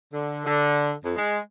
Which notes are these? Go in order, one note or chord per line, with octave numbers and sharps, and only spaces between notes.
D3
D3
F2
G#3